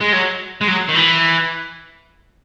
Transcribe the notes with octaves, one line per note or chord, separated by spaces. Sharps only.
G#3
F#3
G#3
F#3
D#3
E3